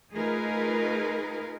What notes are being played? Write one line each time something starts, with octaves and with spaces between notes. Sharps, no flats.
A3 D#4 F4 G#4 A#4 B4